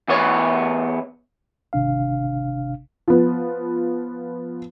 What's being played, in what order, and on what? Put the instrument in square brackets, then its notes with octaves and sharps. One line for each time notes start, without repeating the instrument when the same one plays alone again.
[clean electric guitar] E2 B3 C#5
[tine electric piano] G#1 C3 D4 F5
[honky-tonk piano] F3 B3